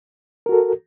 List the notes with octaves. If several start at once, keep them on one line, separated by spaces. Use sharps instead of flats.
F#4 A4 A#4